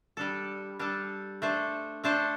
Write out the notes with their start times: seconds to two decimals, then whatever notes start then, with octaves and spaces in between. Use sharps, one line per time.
0.17 G3 D4 A4
0.79 G3 D4 A4
1.42 A3 D4 A4 C5
2.04 A3 D4 A4 C5